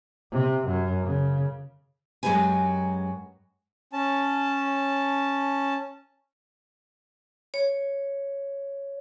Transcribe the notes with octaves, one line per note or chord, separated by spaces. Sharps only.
C3
F#2
C#3
F#2 F#3 G#3 G4 B4 G#5
C#4 A5
C#5